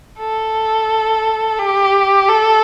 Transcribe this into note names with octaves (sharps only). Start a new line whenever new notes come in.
A4
G4
A4